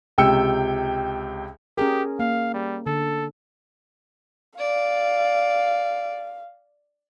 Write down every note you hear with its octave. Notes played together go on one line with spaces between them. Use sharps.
C#2 C3 G5 E6 C#7
C#4 G4 G#4 A#4
A#3 F5
G3
D3 A4
D5 F5